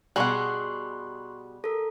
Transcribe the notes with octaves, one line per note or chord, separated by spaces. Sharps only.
B2 G3 F#4 G#4 F#5 C6 C#6 F#6
A4 A#4